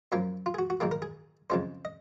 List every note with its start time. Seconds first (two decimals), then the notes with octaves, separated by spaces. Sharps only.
0.12 F#2 F3 A#3 C#4 C#5
0.46 F4
0.54 G#4
0.59 F#4
0.70 F#4
0.80 A#1 G#2 D#3 A#3 G#4
0.91 A#4
1.02 G#4
1.50 F2 C#3 F3 G#3 C#4 C5
1.85 D#5